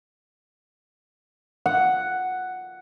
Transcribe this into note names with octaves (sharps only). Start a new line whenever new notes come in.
F#5